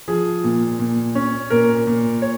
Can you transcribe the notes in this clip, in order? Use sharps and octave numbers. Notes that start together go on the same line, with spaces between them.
F3 G#4
A#2
A#2
C#4
A#2 A#4
A#2
C#5